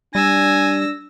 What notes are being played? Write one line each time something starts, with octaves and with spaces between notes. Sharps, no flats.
G3 D4 G#5 E6 A#6